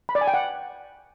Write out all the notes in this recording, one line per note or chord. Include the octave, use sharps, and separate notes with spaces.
B5
D5
G#5
G5
F#5